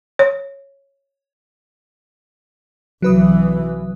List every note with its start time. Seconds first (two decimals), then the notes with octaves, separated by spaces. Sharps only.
0.19 C#5
3.02 C2 E3 F#3 B4 D#6